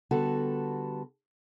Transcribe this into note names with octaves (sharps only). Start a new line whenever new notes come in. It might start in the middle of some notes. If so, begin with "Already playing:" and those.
D3 G3 B3 F#4 A4